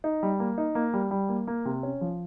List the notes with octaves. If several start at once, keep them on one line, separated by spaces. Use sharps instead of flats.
D#4
G3
A#3
D#4
A#3
G3
G3
A#3
A#3
C3
C#4
F3